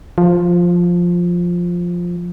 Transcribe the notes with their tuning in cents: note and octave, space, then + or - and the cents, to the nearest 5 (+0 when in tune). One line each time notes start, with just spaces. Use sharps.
F3 +5